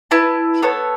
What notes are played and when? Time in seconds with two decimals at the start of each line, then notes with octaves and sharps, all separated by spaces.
0.11 E4 B4 A5
0.62 B3 A4 C#5